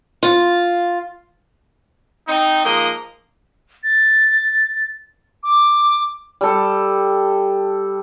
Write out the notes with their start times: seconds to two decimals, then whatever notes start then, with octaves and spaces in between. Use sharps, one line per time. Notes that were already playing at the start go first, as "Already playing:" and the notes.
0.23 F4
2.27 C4 D#4
2.65 G#2 F3 A#3 D#4 D#5
3.84 A6
5.44 D6
6.41 G3 A4